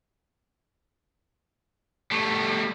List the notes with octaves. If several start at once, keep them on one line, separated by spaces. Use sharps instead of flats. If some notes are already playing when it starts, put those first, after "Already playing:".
G3 A3